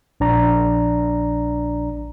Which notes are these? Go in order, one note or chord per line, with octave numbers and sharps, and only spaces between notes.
A#1 D4 D5 A#5